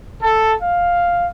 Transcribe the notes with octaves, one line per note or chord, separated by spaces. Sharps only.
A4
F5